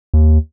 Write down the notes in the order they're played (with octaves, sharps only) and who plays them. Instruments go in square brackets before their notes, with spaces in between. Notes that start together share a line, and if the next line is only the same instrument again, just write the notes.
[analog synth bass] D#2